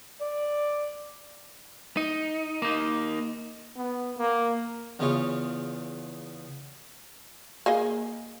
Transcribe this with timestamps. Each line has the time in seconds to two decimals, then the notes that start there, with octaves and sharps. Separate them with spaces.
0.21 D5
1.97 D#4
2.62 A#3 D#4
3.77 B3
4.18 A#3
4.99 E2 C#3 F4 C#5
7.66 A#3 G#4 D#5